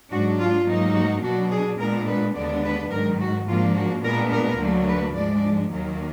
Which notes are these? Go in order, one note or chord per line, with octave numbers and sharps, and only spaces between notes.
G#2 F#3 D4 F#4
F4
G#2 F#3 A#3 D#4
F#4
B2 F#3 D4 F#4
G#4
A#2 G#3 B3 D4 A#4
B4
D#2 D3 G#3 B3 D4 D5
B4
G#2 D#3 F#3 A#4
F#4
G#2 F3 A#3 D4 F4
F#4
A#2 G#3 B3 D4 A#4
A#4
D2 D3 F#3 A#3 D4
B4
G#2 F3 G#3 D4 D5
D#2 D#3 F#3 A#3